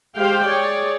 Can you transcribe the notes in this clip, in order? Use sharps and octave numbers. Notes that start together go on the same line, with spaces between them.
G#3 G4 C5 F5 G5
G#4 C#5 D5